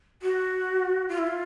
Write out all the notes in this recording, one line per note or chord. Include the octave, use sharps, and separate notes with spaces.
F#4
F4
E4
F4